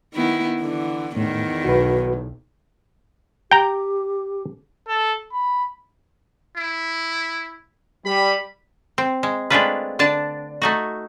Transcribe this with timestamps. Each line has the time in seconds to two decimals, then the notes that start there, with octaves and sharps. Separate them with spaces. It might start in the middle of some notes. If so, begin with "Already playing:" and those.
0.14 D#3 B3 E4
0.60 D3 E3
1.16 E2 A2 D#3
1.65 B1 F#4 B4
3.51 G4 G5 A#5
4.89 A4
5.33 B5
6.57 E4
8.05 G3 B5
8.98 C4
9.23 G#3
9.50 G#3 A3 C4 D4 F4 B4
9.99 D3 D4 A5
10.62 A3 D#4 F#4